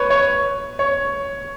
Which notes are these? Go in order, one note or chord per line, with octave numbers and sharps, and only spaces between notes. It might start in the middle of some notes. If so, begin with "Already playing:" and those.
Already playing: B4 C#5
C#5
C#5